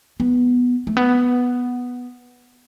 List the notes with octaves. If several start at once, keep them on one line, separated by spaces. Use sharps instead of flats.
B3
A3
B3